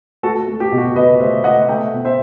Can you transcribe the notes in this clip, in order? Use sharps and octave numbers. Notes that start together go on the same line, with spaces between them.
A3 F#4 A4
A3
G4
B2
F#4
B2 B4 D#5
A3 C5 E5
A3 D#5 F#5
A3 E5 G5
B2
C5 E5